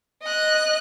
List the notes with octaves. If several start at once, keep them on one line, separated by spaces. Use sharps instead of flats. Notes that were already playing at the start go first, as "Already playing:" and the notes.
D#5 F#6